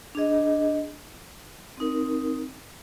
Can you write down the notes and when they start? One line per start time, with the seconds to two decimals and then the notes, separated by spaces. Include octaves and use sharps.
0.15 D4 G#4 D#5
1.77 C4 D#4 A#4